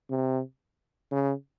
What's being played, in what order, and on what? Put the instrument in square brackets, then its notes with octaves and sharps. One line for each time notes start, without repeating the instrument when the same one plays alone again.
[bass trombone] C3
C#3